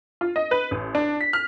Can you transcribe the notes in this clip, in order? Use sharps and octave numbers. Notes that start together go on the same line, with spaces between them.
F4
D#5
B4
A1
D4
B6
F6